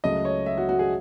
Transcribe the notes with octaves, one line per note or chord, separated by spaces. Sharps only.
C#2 C#3 F#3 A3 D#5
C#5
E5
F#4
F#4
G#4